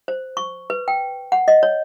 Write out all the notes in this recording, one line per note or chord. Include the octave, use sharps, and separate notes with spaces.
C5
C#6
B4
G5
F#5
D#5
C#5